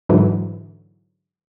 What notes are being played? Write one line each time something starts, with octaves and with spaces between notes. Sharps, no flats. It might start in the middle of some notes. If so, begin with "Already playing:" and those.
G#2 D3 E3 F#3